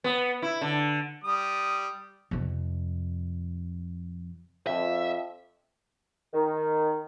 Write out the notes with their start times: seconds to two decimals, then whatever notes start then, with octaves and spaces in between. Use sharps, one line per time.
0.04 B3
0.42 E4
0.61 D3
1.24 G3 D#6
2.31 F2 C3
4.67 F2 E5
6.33 D#3